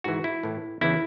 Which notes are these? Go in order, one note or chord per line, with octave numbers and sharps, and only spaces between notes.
G#2 E3 F#4
E4
A2 E3
E2 C#3 E3 E4